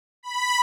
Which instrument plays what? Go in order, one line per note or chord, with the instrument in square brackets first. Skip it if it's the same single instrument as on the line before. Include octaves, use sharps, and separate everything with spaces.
[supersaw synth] B5